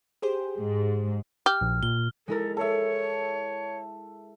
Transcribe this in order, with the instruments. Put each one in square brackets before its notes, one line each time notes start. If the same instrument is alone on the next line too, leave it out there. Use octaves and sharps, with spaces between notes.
[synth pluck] G4 G#4 C5
[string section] G#2
[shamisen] G4 [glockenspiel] F6
[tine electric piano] A#1
[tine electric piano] A#2 [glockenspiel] G7
[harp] G#3 E4 A#4 [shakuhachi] A4
[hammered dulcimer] A4 E5 [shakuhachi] C#5